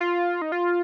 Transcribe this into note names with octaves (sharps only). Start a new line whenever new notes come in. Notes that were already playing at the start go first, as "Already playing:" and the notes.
F4
D#4
F4